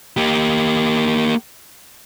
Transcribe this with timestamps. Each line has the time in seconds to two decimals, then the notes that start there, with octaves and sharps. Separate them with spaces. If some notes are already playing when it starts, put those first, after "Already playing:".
0.17 A#3 G4